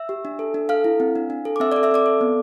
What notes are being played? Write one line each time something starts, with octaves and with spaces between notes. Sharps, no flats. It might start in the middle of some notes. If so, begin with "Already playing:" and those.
Already playing: E5 E6
G4
D4
A4
D4
A4 F5 F6
E4
C4
D4
D4
A4
D6
C4 E5 E6
A4 D5 D6
E5 E6
C4 D5 D6
A4
B3